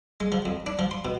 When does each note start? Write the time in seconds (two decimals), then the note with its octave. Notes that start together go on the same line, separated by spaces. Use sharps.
0.20 G#3
0.32 F3
0.45 F2
0.66 D4
0.79 F3
0.91 C6
1.05 B2